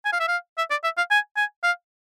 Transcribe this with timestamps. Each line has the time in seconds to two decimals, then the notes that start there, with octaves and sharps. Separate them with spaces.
0.05 G#5
0.13 F5
0.20 E5
0.28 F5
0.58 E5
0.71 D5
0.84 E5
0.97 F5
1.11 G#5
1.36 G#5
1.63 F5